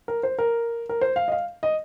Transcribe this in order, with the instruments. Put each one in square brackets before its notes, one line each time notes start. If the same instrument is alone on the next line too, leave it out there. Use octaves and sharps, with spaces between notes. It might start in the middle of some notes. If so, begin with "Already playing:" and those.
[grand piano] A#4
C5
A#4
A#4
C5
F5
D#5
F5
D#5